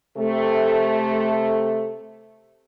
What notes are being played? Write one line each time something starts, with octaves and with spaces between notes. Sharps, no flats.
C3 A3